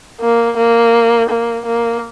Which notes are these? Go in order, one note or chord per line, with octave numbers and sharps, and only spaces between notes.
A#3
A#3
A#3
A#3